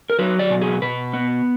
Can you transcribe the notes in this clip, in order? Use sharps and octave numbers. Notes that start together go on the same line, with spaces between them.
A#4
F#3 B4
D5
B2
G#4
B2 B4
B3